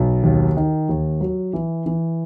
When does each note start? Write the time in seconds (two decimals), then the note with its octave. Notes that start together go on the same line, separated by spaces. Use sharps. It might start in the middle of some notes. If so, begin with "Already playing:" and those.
Already playing: B1
0.23 D#2
0.57 D#3
0.89 D#2
1.21 F#3
1.53 E3
1.86 E3